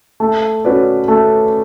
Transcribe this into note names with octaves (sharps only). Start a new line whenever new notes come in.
A3
C#4 F#4 B4 D5
A3